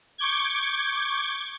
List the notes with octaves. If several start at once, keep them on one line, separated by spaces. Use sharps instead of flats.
C#6 D6 G6 G#6